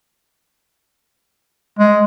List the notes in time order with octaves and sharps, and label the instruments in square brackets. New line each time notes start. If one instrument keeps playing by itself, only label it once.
[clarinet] G#3